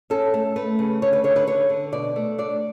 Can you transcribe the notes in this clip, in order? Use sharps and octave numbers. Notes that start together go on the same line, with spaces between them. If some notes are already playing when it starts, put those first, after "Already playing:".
C#4 A4
A3
A3 B4
C#3
D3 C#5
B4
D3 C#5
B4
D3 C#5
D3
B2 D5
A3
D4 D5